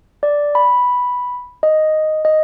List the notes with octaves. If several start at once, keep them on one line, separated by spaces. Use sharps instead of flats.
D5
B5
D#5
D#5